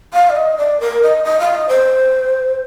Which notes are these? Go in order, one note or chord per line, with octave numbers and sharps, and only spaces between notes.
F5
D5
D#5
D5
A#4
D#5
D#5
F5
D#5
C5